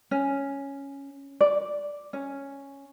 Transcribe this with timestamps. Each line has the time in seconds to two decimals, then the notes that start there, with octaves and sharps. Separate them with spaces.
0.11 C#4
1.41 D5
2.13 C#4